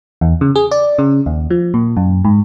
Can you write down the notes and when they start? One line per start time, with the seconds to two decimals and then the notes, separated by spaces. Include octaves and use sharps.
0.21 E2
0.41 C#3
0.56 G#4
0.71 D5
0.99 C#3
1.26 D#2
1.50 F3
1.74 A#2
1.97 F#2
2.25 G#2